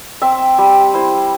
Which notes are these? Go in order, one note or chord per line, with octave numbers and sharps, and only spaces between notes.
C4 E5
G3
E4 C5